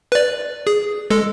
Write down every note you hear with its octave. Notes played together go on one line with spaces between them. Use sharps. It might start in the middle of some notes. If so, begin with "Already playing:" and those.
B4 D5
G#4
G#3 A4